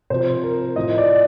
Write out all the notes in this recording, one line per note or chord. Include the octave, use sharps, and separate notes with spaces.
C3 F3 C5
A#4
A2 F3 D#5
D5